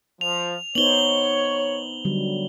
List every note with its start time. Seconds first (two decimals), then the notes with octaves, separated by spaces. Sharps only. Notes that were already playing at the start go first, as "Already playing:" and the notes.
0.21 F3 F7
0.75 B3 D#4 C5 C#5 F#7 G7
2.05 D3 F#3 G3